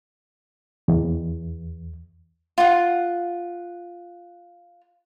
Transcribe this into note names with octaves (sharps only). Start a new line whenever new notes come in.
E2
F4 F#5